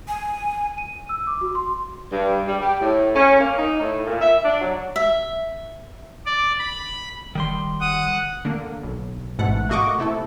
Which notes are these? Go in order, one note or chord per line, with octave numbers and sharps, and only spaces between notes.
G#5
D#7
E6
D6
F#4
C6
G2
G3
G4
A2
C#4
A#3
D#4
A2
A#2
E5
D4
F#3
E5
D5
B5
F1 D#3 G3 C6
F#5 D#6
D3 A#3
B1
A1 G#2 B2 A3 F#5
A3 A#3 F#4 D#5 C#6 D6
C3 A3 E4 A4